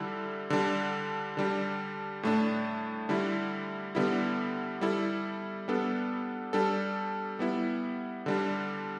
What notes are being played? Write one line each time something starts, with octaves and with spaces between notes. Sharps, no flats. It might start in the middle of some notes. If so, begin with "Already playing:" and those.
Already playing: D3 G3 E4 A4
D3 G3 D4
D3 G3 D4 G4
A2 A3 D4
D3 G3 E4
D3 G3 B3 E4
G3 E4 A4
G3 B3 D4 A4
G3 D4 A4
G3 B3 E4
D3 G3 D4